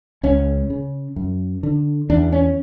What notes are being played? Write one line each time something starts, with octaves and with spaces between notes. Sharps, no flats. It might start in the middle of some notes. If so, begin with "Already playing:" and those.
C#2 C#4
C#3
F#2
D3
E2 D4
C#4